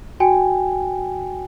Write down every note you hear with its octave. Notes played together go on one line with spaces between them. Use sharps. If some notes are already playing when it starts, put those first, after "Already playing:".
F#4 G5 G#5